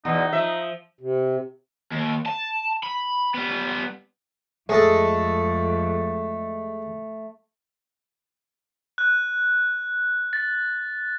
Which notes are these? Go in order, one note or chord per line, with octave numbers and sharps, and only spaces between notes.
E2 B2 D#4
F3 E5
C3
D#2
A5
B5
G3 B3
F2 G#3 A3 G#4 A4
F#6
A6